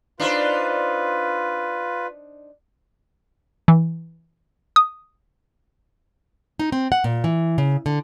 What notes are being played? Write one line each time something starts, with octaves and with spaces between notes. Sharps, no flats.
D4 D#4 F4 B4 C5
E3
D#6
D#4
C4
F#5
A#2
E3
C#3
D3